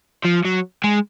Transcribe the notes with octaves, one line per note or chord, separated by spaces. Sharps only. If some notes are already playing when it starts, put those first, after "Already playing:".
F3
F#3
G#3